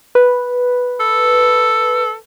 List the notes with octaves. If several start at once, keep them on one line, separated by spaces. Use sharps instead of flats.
B4
A4